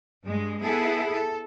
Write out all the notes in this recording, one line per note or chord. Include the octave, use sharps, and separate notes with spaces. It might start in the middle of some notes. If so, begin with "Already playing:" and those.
G2 G#3
B3 E4 G#4 A4
A4